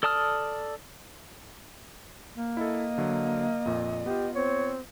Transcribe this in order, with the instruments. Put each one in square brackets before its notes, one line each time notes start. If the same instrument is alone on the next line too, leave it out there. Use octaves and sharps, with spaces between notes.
[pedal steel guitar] A4 D5 A5 D#6 F6
[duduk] A#3
[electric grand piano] E4 A4 [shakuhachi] D#5
[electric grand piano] D3 F#3
F2 A#2
[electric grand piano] B3 F4 [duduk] G4
[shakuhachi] C4 [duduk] C#5